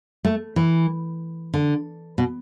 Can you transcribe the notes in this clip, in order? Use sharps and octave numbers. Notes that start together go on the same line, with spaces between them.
A3
E3
D3
B2